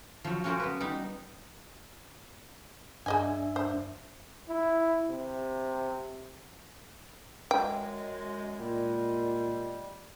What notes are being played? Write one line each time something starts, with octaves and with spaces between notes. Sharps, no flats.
F3 F#3
C#4 F#4 G4 A#4 C5 D5
B3 B4
G3 D#4 B5
G2 D4 G#4 D#5 E5 G#5
C5
E4
C3
F#2 G#3 G5
A#2 G3 G#3